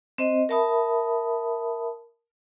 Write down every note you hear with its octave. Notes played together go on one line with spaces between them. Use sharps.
C4 C5 D#5
A#4 E5 A5 B5 D#6